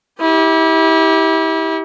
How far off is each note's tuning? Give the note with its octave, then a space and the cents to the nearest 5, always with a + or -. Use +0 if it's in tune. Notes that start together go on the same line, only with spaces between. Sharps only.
E4 -35 G4 +0